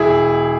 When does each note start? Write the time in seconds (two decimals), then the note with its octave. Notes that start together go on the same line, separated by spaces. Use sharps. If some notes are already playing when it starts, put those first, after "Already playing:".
Already playing: E1 E4 G#4